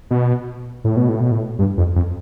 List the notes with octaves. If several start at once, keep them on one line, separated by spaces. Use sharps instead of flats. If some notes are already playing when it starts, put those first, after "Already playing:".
B2
A2
B2
A2
B2
A2
G2
F2
F2